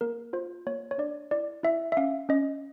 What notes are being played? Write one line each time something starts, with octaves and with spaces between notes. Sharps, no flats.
A#3 A#4
F4 C5
A#3 C#5
C#5
D4 D5
E4 D5
E4 E5
E5
C#4 F5
C#4 D#5